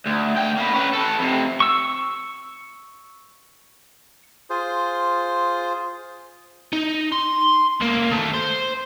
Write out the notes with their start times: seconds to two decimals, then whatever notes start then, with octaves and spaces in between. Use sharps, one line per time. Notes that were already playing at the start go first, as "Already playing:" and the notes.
0.06 D2
0.37 D2 G5
0.58 A#3 B4
0.74 C#4 B4
0.93 A4 B4
1.19 F2 C3
1.60 C#6 E6
4.50 F4 G#4 C5
6.73 D#4
7.12 C6
7.80 C#2 A#3
8.11 D#3 A3
8.34 C5